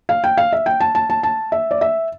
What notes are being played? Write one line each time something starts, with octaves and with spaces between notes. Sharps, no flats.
F5
G5
F5
E5
G5
A5
A5
A5
A5
E5
D5
E5